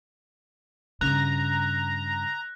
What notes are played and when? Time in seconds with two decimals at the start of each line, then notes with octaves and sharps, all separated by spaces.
1.01 G2 C#3 A#5 F#6 A#6